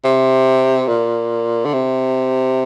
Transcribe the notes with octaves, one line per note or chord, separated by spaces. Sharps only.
C3
A#2
D3
C3